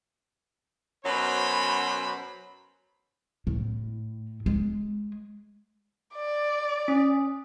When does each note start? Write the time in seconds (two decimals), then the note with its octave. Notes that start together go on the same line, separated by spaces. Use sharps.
1.05 F#2 B2 F#3 C5 B5
3.47 A2
4.46 G#3
6.15 D5
6.88 C#4